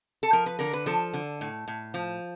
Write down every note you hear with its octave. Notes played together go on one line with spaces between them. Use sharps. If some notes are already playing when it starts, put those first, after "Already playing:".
A4
F3 A#4
B4
D3 A#4
B4
F3 A4
D3
A2
A2
F3